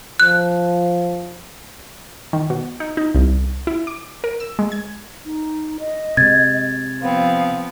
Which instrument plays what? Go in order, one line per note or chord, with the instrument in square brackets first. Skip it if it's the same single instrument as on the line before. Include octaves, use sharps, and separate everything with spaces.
[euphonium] F3 [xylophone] F#6
[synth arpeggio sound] D#3
B2
D#4
D#4
C2
E4
D6
A#4
E6
G#3
G#6
[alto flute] D#4
D#5
[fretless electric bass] C3 G#3 [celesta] G#6 A6
[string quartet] F3 B3 C4 [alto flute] F5